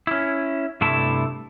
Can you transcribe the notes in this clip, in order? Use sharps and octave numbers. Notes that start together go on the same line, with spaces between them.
C#4 E4
G2 C3 A3 E4 A5